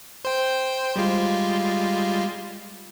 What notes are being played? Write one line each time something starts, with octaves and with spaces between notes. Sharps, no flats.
C5 G5
G3 G#3 F4